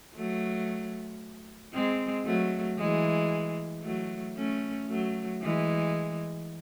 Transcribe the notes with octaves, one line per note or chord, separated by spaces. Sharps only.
F#3 A3
G#3 C4
F#3 A3
E3 G#3
F#3 A3
A3 C#4
F#3 A3
E3 G#3